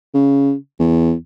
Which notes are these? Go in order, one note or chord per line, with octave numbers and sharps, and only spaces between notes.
C#3
E2